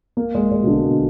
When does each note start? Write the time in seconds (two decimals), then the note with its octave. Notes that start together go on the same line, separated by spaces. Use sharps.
0.17 A#3
0.35 G#3
0.51 G#3
0.63 B2
0.67 D3
0.84 B2